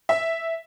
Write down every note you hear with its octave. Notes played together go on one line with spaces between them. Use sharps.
E5